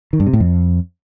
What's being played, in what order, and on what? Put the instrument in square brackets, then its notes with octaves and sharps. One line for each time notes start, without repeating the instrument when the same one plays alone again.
[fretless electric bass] D#3
G2
C3
A2
F2